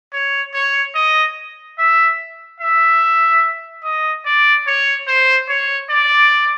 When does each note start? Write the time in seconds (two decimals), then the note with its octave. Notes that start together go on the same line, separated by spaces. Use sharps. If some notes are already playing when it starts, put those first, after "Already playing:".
0.13 C#5
0.54 C#5
0.95 D#5
1.78 E5
2.60 E5
3.84 D#5
4.25 D5
4.67 C#5
5.07 C5
5.49 C#5
5.90 D5